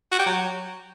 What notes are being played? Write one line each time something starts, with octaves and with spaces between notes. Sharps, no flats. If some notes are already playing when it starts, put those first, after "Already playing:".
F#4
G4
F#3